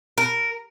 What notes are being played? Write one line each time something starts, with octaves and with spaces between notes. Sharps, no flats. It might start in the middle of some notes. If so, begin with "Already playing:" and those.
A#4